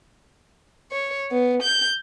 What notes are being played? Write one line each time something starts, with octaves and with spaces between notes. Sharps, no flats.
C#5
B3
G6